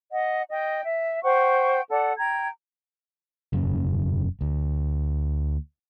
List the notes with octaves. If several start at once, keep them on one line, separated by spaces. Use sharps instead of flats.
D#5 F#5
D#5 G5
E5
C5 F#5 G5 C#6
A4 D5 F#5
G5 A#5 G#6
E1 F#2 C#3
D2